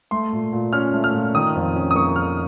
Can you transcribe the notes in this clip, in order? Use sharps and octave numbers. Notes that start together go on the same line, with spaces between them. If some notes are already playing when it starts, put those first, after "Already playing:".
A3 C6
A#2
A#2
C#4 F6
A3
F6
A#2
D#3 D#6
F2
C#4
D#6
A#3 C#6
D#3 F6